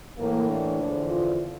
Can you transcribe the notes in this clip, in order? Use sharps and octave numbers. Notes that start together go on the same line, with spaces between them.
A2 E3 A#3
D4
E2 D3 F3
F4